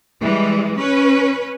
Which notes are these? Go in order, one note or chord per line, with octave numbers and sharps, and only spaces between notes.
E3 G3 G#3
C#4 B4